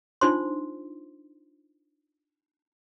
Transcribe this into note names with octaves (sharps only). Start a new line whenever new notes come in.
D4 D#4 F4 C5 C6